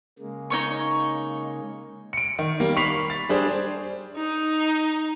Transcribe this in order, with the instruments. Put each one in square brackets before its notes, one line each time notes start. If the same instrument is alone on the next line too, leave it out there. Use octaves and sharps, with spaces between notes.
[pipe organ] C#3 G#3 A#3
[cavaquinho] D#4 C#5 C#6
[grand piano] C#7 D7
D#3
G3 A#3
B5 C#6 B6 C7 F7
A6
G3 D4 G#4 C5
[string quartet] D#4